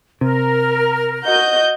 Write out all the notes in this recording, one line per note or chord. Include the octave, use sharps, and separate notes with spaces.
C3 A#4
F#4 D#5 G6